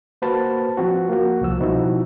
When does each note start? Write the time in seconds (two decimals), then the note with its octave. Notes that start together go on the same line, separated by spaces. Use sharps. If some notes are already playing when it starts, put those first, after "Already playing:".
0.22 A#3 F#4 B4 C5 A5
0.77 F3 C4 F#4
1.09 A#3 F#4
1.41 C2 F3 E6
1.60 B2 F3 C4 D#4 E4 F#4